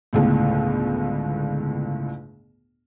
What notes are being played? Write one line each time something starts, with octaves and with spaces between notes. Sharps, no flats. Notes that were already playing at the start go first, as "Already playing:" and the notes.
G1 C#2 A2